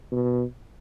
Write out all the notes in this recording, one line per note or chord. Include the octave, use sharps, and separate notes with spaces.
B2